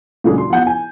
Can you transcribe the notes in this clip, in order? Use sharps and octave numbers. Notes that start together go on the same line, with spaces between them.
A#2 C#3 F#3 G#3 D4 G#4
C6
F3 B3 F#5 G6
G#5